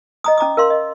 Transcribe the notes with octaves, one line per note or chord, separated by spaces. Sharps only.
D#5 A#5 D#6
C#4 A#5 D6 D#6
A#4 F5 C6
D#5